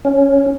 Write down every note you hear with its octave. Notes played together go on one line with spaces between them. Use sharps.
C#4